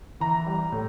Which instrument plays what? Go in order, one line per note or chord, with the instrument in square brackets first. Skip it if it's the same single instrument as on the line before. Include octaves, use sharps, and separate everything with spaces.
[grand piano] E3 A#5
G3
A2